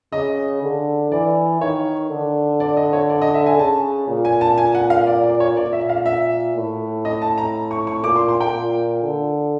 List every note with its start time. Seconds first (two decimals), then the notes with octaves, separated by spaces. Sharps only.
0.13 C#3 D#5
0.63 D3
1.11 E3 D5
1.61 D#3 C#5
2.10 D3
2.60 D5
2.77 D#5
2.93 C#5
3.10 D5
3.22 D#5
3.34 E5
3.47 G#5
3.58 C#3 A5
4.08 A#2
4.25 G#5
4.41 A5
4.58 G#5
4.75 F#5
4.90 F5
5.07 D5
5.24 D5
5.40 C#5
5.57 A#2 D5
5.73 E5
5.89 F5
6.06 E5
6.56 A2
7.05 D#5
7.22 A5
7.38 A#5
7.71 C#6
7.87 C#6
8.04 A#2 D6
8.16 C6
8.28 C6
8.41 G5
8.53 A#2
9.03 D3